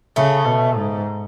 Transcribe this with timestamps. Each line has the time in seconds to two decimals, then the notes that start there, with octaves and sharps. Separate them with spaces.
0.16 C#3 A3
0.46 B2
0.75 G#2